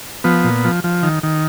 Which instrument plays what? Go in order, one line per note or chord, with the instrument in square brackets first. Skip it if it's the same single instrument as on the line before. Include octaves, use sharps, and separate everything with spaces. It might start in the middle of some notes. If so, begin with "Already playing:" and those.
[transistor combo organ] F3 B3
A#2
F3
F3
D#3
D#3